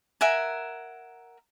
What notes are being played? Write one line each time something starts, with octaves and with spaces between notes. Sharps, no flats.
A#4 E5 F#5 G#5